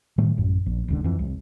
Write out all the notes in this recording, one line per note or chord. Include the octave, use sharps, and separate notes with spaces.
A2 D#3 G3 A3
A1 F#2
A#1
E1 C#2 D3
F2 E3
C2